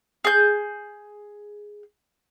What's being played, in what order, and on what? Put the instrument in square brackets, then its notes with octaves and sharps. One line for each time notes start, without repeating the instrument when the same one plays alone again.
[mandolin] G#4 G6